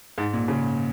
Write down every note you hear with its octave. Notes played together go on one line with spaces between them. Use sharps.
G#2
A#2
C#3